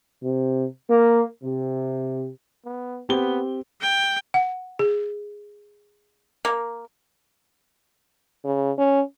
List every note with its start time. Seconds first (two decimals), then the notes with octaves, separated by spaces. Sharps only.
0.23 C3
0.90 A#3
1.44 C3
2.65 B3
3.09 B3 C4 G4 G7
3.81 G5
4.34 F#5
4.79 G#4
6.45 A#3
8.44 C#3
8.78 C#4